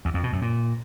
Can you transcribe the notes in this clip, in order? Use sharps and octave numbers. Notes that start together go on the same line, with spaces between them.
E2
F2
B2
F#2
A#2